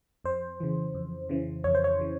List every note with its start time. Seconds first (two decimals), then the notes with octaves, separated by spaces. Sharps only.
0.24 F2 C5
0.60 C#3 E3
0.94 F2
1.29 C#3 E3
1.64 F2 C#5
1.75 C5
1.84 C#5
1.99 C#3 E3